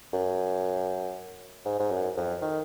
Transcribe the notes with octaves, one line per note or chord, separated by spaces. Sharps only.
F#2
G#2
G#2
F#2
F2
D#3